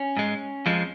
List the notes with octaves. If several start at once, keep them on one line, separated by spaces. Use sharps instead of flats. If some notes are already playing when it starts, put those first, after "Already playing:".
Already playing: C#4
G#2 G#3
F2 F3 G#3